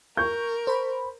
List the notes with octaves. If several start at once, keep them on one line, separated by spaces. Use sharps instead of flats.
A#4 C#6 G6
C5 B5